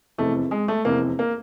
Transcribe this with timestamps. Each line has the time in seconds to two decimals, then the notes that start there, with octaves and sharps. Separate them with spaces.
0.18 F1 E2 C3 A3
0.51 G#3
0.68 A3
0.85 F1 E2 C3 A#3
1.19 A#3